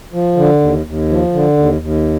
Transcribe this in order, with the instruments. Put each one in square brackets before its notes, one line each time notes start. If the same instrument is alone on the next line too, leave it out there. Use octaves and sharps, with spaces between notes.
[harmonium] F3
D3
D#2
D#2
F3
D3
D#2
D#2